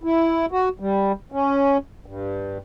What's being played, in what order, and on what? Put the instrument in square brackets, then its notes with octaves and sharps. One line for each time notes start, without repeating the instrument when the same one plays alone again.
[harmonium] E4
F#4
G3
C#4
G2